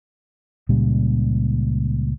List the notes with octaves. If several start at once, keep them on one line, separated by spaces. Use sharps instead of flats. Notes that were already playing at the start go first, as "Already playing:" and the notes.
C#2 A#2 C#3 G3